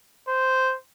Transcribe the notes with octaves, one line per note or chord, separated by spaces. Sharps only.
C5